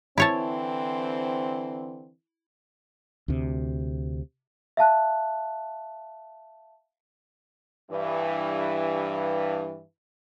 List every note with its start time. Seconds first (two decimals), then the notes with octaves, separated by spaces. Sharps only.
0.18 D3 E3 C4 E4 C#5 A5
3.28 D2 C3
4.77 E5 F5 A5 F#6
7.91 G2 E3